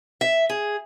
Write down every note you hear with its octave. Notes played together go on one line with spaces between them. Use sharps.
E5
G#4